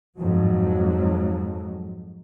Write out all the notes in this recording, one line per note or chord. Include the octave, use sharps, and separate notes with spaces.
F2 G#2 F#3